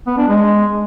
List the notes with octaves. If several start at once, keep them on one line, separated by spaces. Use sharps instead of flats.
B3
D4
G#3